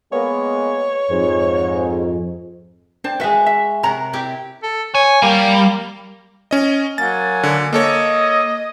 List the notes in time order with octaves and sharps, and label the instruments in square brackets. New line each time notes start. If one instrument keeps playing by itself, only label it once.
[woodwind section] G#3 A#3 B3 [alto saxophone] C#5
[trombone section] F2 [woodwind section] G#2
[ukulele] D4 C5 G5 [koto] A5
[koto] G#3 F#4 [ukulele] B4 E5
[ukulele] E5
[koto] C3 A#4 F#5 [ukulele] C#5 A#5
[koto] C4 E4 G4
[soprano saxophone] A4
[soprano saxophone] C#5 [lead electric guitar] G#5
[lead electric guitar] G3 [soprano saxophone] A#3
[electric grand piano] C#4 D#5
[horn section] F#3 A#3 G#5 [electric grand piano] A6
[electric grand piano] D3
[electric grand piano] A#3 A4 C#5 [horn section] D#5